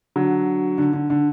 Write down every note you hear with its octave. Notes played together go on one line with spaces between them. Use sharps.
D3 F#3
D3
D3
D3